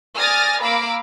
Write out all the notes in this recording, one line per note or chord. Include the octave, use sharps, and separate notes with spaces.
D5 G#5 D#6 F6 A6 A#6
A#3 F5 A#5 B5 D6 E6